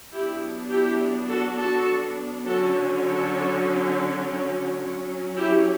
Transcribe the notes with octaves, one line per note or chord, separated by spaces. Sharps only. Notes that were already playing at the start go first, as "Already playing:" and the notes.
F#3 B3 D4 E4 G4
E4 G4
F#4 A4
F#4 A4
D3 F#3 C#4 F#4 A4
A4 C#5
F#3 C#4
E4 G4